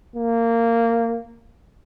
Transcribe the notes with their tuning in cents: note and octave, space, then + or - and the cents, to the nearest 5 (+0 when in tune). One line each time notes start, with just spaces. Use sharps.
A#3 -15